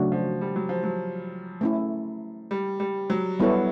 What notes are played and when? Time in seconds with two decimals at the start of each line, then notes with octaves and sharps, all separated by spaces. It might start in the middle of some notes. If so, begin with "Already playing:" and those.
Already playing: C#3 F#3 A3 D4 F#4
0.12 F3
0.41 G3
0.56 F#3
0.69 F3
0.83 F#3
1.61 A3 C#4 E4
2.51 G3
2.80 G3
3.10 F#3
3.40 G3 B3 E4 A4 C#5